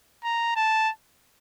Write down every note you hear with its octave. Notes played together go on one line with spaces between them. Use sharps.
A#5
A5